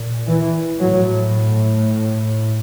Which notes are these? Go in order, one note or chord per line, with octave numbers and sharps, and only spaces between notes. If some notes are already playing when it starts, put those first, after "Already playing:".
Already playing: A#2
E3
A2 F#3